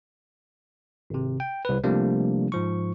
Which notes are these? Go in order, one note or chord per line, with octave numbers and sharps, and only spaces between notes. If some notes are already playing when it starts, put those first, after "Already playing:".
G#1 C3
G5
C2 B4
C3 F3 G3 A3 A#3 D4
G#2 F3 C#6